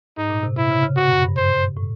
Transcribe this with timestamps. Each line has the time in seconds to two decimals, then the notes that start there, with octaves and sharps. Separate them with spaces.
0.17 G#2 D#4
0.30 A#2
0.43 C3
0.56 C3 E4
0.71 C#3
0.83 C#3
0.96 B2 F#4
1.11 F#2
1.24 G2
1.37 G2 C5
1.77 A2